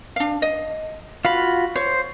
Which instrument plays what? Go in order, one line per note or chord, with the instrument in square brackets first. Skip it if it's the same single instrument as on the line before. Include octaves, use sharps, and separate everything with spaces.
[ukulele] D4 F5
D#5
[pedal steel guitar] F4 F#4 B5 [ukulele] F5
[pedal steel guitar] C5 [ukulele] C#5